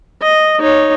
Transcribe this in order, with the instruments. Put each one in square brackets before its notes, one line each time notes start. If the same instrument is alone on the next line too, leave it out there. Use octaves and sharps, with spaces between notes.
[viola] D#5
D#4 C#5